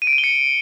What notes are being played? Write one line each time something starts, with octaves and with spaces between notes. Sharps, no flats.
D#7
D7
D#7
G7
C#7